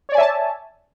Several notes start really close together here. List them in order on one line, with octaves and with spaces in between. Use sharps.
C#5 D5 G#5 E5 A5